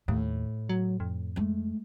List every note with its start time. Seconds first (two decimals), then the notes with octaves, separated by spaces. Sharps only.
0.08 D#2 A2
0.69 F#3
1.00 F2
1.36 G#3 A3